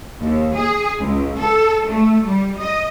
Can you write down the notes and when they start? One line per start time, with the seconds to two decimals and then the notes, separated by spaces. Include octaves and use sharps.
0.22 D#2
0.56 G#4
1.00 C#2
1.38 A4
1.88 A3
2.26 G3
2.60 D#5